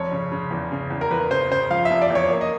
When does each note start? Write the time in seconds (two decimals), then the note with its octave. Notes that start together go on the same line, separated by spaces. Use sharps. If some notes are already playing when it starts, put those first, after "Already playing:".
Already playing: F1 C#5
0.12 C#3
0.32 C#3
0.51 E2
0.72 C#3
0.90 E2
1.01 A#4
1.11 E2 B4
1.31 C#3 C5
1.50 C#3 C5
1.70 F3 F5
1.85 E5
1.91 F1
2.02 D5
2.10 E2 C#5
2.31 A#3
2.41 D#5